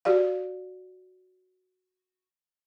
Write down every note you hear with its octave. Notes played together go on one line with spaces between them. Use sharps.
F#4 G4 D5 F5